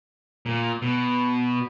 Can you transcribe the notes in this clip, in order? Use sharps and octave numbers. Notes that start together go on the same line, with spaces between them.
A#2
B2